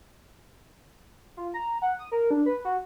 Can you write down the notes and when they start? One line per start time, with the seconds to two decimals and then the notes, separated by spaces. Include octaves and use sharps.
1.37 F4
1.54 A#5
1.82 F#5
1.99 D#6
2.12 A#4
2.31 D4
2.46 B4
2.65 F#4